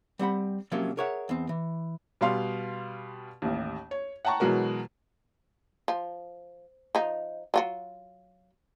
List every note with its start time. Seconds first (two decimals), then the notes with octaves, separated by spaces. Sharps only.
0.19 G3 C4 F#5 B5
0.72 C3 F3 F#3 A#3 C#4
0.97 G#4 A#4 C#5 E5 F#5
1.29 E2 C4
1.49 E3
2.21 B2 G3 F5 C6
3.42 A1 D#2
3.91 C#5
4.25 F#5 G5 A5 A#5 C#6
4.40 B2 E3 F#3 G#3 F#4 A#4
5.88 F3
6.95 F3 D#4
7.54 F#3 F4 F#4